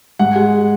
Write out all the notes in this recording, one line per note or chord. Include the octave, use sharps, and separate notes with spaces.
G#2 F#5
G#3